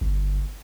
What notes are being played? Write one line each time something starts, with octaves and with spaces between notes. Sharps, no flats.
G1